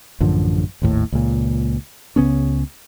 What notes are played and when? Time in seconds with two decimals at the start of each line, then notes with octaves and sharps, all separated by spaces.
0.20 A1 F#2 D3 F3
0.82 G#1 D#2 A2
1.12 C#2 A#2
2.16 C#2 C#3 B3 C#4